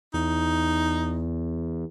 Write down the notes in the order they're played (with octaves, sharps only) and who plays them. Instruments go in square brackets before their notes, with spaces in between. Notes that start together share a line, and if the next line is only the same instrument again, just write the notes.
[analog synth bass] E2 [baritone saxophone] D#4